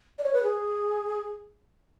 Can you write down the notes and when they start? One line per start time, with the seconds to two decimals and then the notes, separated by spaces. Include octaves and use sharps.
0.19 D5
0.24 C#5
0.33 B4
0.43 G#4